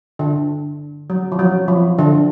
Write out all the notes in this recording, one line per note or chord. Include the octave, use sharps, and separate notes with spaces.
D3
F#3
F3
F#3
F3
D3